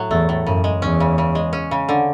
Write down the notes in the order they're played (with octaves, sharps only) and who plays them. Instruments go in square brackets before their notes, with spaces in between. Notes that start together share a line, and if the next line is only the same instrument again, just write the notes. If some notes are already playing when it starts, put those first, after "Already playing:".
Already playing: [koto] A2 F#3
[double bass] E2 [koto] A3
[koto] A2
[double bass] F#2 [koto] C#3
[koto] G#3
[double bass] E2 [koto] C#4
[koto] C#3
C#3
G#3
C#4
C#3
D3